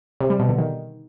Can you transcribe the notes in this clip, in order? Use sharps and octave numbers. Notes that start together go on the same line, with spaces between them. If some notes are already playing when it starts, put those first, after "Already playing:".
C3
G3
B2
D3
D#3